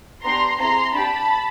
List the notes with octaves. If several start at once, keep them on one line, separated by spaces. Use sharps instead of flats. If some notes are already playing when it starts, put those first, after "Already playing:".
B3 D4 G4 A#5 C6
C4 E4 G#4 A#5 C6
D4 G4 A5 B5